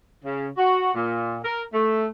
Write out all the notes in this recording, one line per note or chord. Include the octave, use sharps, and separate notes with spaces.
C#3
F#4
A#2
A#4
A3